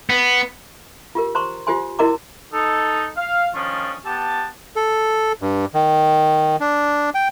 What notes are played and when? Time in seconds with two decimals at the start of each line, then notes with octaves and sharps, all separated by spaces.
0.10 B3
1.15 F4 G4 A#4
1.35 C5 A#5 C6 C#6
1.67 F4 G4 C5 G#5 C6
1.99 E4 F#4 A#4 D#5 A#5 D6
2.53 D#4 A4
3.17 F5
3.54 D#3 F3 C#4 D4 F4
4.06 B3 G4 A5
4.76 A4
5.42 G2
5.74 D#3
6.60 D4
7.15 G5